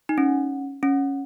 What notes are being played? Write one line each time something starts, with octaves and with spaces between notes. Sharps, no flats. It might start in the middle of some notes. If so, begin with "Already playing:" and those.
D#4
C#4
C#4